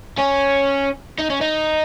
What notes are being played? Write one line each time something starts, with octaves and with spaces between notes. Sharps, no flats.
C#4
D#4
C#4
D#4